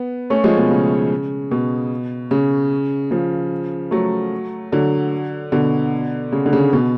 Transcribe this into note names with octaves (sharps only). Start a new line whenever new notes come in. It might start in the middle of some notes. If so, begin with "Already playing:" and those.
Already playing: B3
A3 C#4
F3 G#3
B2
C#3
B2
C#3
C#3 F3
F#3 A3
D3 F#3
B2 D3
C#3
D3
C#3
B2